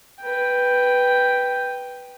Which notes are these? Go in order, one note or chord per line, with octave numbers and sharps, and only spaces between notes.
B4 G5